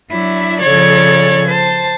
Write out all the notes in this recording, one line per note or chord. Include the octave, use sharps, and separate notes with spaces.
F#3 D4 E4 E5
C#3 F3 A4 C#5 D5 G#6
C5 A5